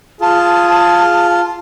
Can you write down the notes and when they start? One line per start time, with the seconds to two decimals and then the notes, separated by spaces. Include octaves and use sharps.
0.21 F4 G#4 A5